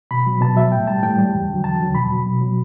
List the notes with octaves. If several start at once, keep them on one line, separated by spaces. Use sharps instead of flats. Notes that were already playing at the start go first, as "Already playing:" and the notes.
B2 B5
F#3
B2 A5
F#3 E5
A2 G5
G3 A5
A2 G5
G3
E2
D3
F#3
E2 A5
D3 F#3
B2 B5
F#3
B2
F#3